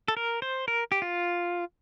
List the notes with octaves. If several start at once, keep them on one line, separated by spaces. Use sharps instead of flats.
A4
A#4
C5
A#4
G4
F4